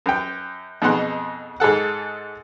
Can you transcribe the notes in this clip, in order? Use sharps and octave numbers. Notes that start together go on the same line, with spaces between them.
F#2 G5
F2 B2 D#4 G#4 F#5 C6
G#2 G#4 A4 F#5